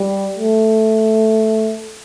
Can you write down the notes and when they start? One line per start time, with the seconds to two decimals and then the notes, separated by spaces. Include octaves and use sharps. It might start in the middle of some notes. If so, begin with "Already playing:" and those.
Already playing: G3
0.37 A3